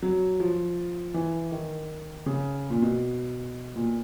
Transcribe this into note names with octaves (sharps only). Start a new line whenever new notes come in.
F#3
F3
E3
D#3
C#3
A#2
B2
A#2